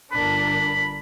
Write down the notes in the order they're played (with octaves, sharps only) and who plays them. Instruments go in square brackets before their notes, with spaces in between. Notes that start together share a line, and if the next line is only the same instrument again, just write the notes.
[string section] G1 D4 A#4 [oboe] B5